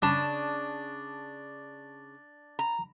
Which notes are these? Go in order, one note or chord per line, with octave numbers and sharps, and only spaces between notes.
C#3 D4 A5
A#5